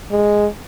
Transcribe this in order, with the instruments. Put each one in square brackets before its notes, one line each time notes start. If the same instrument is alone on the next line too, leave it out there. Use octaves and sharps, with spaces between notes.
[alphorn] G#3